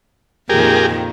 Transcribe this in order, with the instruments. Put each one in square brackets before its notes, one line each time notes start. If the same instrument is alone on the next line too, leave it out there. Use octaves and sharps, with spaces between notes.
[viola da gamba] F2 A#2 D#3 [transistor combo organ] G4 G#4 A#4